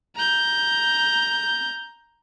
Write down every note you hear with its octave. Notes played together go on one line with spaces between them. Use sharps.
A#5 G6